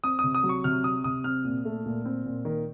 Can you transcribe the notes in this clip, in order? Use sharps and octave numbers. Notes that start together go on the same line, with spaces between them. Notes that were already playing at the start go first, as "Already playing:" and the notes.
C4 D#6
C3 D#6
D#6
F#3
C#6
C3 F6
C4 D#6
C3 D#6
C4 F6
A#2
A3
A#2
C4
A#2
D#3